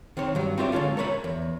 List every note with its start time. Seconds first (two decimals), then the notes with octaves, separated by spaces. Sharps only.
0.17 D#3 C4 C#5
0.35 G2 F#3
0.58 C4 E4 F4 G4 D5 E5
0.72 D3 G#3 C#4 F4 A4
0.97 A4 A#4 C#5 F5 B5
1.24 E2